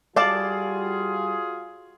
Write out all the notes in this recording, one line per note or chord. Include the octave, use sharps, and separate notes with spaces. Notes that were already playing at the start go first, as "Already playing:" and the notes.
G3 F4 F#4 G#4 A4 D5 F5 A5